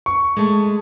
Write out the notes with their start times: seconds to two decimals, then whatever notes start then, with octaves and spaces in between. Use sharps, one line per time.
0.06 C#6
0.37 G#3 A3